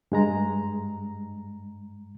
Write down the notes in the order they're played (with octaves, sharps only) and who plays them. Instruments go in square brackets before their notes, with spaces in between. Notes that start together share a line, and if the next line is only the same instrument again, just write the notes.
[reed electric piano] G2 G#3 A#5